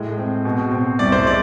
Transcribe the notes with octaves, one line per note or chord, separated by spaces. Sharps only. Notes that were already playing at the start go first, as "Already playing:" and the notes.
Already playing: A2 G#3
C4
B2
C4
C2 D5
C5
G#3 D5